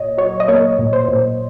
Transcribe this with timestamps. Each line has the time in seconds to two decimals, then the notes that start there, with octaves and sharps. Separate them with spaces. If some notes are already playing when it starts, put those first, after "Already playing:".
Already playing: A#2 C#5 D#5
0.18 F#3 C#5
0.40 D#5
0.48 A#3 C#5
0.79 A#2
0.93 C5
1.08 A#2